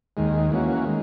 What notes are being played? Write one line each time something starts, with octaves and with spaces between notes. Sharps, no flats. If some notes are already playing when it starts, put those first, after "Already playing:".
D#2 D#3 G#3
E3 A#3 C#4 F#4
D#3 G#3